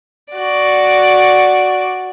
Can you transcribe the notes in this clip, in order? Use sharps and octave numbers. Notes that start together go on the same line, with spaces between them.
F#4 D5